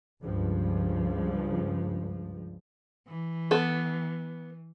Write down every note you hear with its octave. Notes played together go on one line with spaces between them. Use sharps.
C#2 G2 F3
E3
B3 A4